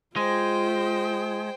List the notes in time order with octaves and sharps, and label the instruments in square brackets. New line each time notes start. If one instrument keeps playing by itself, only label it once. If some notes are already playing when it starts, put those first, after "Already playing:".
[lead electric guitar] G#3 [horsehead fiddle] F4 [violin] C5 G5